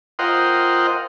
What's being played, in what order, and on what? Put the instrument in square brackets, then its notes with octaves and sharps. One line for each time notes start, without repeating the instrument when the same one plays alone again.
[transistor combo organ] F4 A#4 C5 D#5 F#5 G5